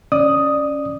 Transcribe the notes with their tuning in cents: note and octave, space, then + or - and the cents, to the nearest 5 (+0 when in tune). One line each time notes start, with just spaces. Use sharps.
C#4 +0 D5 +20 D#6 +0